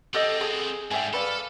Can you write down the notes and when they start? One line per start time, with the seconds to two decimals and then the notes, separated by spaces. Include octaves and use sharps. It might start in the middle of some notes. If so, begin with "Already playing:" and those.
0.14 B3 C4 G4 A4 D#5
0.41 G#4 D#6
0.91 G#2 G3 G#4 E5 G5
1.13 A4 B4 D5 F5